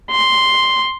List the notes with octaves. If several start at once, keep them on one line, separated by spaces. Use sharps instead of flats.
C6